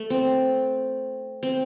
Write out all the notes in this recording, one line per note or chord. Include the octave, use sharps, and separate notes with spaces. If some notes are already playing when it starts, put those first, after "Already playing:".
Already playing: A3
C4
C4